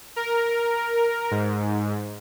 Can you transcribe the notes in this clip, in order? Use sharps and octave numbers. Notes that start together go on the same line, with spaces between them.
A#4
G#2